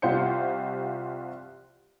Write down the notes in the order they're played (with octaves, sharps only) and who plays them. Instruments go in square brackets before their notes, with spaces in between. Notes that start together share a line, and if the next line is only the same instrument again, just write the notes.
[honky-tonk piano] C2 F4 G4 C5 G6 C#7